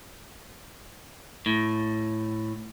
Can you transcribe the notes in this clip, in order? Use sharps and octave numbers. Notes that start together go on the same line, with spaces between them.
A2